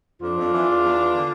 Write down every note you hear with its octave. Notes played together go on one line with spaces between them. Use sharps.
F2 D4 F4
F2
E3
E2
E2
E3
D3